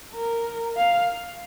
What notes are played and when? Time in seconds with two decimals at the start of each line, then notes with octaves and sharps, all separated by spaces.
0.15 A#4
0.77 F5